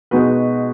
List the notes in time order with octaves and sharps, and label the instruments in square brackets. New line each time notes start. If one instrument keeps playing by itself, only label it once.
[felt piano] B2 G#3 D#4 F#4 B4